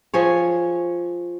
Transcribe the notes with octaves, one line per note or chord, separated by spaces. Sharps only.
F3 G#4 C#5